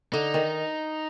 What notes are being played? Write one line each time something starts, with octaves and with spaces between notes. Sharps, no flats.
D3 D#4
D#3